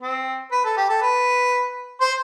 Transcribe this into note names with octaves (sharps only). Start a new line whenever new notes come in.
C4
B4
A4
G4
A4
B4
C5